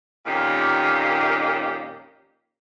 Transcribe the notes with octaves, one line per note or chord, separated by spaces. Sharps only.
F2 A#2 D#3 A#3 C#4 G4